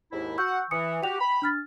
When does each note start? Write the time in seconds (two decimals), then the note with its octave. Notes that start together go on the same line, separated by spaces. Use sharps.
0.12 D#2 G#2 E4
0.38 F#4 F#5 C#6 E6 G6
0.71 E3 D#6 C#7
1.03 F#4 G4 G5 F7
1.19 B5
1.42 D4 F6 A6